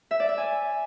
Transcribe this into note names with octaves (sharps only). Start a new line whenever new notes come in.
E5
D5
E5
G#5